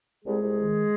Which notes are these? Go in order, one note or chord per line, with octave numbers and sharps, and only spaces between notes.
C2 G#3 G#4
C2
D#3